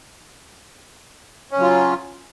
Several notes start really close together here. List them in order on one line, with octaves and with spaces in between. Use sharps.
C#4 C#3 F#3 F4